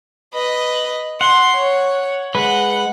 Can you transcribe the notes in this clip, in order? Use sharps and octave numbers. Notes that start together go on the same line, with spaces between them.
B4 D#5
F#5 C6
C#5
G#3 B4 F#5